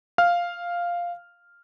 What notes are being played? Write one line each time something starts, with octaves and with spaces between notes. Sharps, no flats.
F5 F6